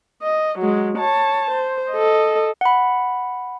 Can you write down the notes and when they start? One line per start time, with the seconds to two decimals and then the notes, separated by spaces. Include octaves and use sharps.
0.23 D#5
0.59 F#3 G#3
0.99 C#5 A5
1.51 C5
1.92 A4 D#5
2.61 F#5 B5